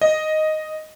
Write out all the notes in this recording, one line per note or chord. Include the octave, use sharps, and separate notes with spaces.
D#5